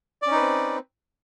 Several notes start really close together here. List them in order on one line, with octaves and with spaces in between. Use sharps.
D5 C#4 D#4 B4 C4